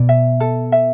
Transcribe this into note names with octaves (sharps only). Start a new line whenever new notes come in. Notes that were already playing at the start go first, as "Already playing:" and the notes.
Already playing: B2 D5
E5
A4
E5